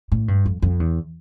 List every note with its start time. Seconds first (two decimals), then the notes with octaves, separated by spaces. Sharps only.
0.12 A2
0.28 G2
0.46 F2
0.62 F2
0.80 E2